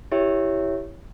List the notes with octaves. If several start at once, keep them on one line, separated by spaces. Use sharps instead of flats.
E4 G4 C#5 E5